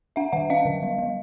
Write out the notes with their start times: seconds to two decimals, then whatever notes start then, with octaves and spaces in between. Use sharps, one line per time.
0.16 D4 E5 F#5
0.33 D#3 E5 F#5
0.50 C#4 D#5 F5
0.65 D3
0.83 G3
0.98 G3